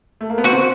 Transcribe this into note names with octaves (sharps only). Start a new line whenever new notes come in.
A3
A#3
B3
C4 F#4